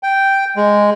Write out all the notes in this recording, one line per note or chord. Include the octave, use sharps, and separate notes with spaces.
G5
G#3